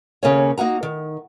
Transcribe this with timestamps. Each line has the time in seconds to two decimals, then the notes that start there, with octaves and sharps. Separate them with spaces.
0.23 D#2 C#3 A#3 C#5
0.58 A#3 D#4 F#4 A#5
0.83 D#3